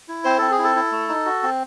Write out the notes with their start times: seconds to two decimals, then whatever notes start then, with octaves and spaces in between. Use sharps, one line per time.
0.08 E4
0.25 C4 C5
0.38 C4 A4
0.51 G#4
0.59 E4
0.64 A4
0.76 E4
0.92 A3
1.09 D#4
1.26 F#4
1.43 C4